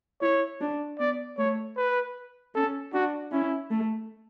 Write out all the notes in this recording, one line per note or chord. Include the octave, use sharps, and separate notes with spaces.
E4 C#5
D4
B3 D5
A3 C#5
B4
C#4 A4
D4 F#4
C#4 E4
A3